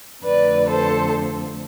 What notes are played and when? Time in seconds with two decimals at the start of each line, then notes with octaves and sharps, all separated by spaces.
0.24 F2 D3 A3 B4 D5
0.70 A4 C5